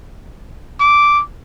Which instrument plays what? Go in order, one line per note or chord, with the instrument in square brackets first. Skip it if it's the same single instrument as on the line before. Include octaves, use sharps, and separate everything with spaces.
[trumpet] D6